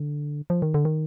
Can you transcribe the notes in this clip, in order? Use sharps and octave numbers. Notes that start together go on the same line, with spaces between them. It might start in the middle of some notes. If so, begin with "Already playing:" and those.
Already playing: D3
F3
D#3
D3
D#3